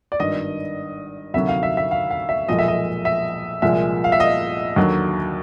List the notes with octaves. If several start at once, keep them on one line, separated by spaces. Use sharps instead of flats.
D5
G#1 G2 D#3 D#5
D2 C3 D#3 F#3 E5
F5
E5
E5
F5
F5
E5
B1 A#2 F3 G#3 D#5
E5
D#5
E5
C2 A#2 F3 G#3 E5
F5
E5
D#5
D#2 D3 F#3